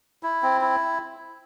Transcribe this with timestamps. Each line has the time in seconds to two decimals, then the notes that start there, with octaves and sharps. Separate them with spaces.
0.23 E4
0.43 C4
0.61 E4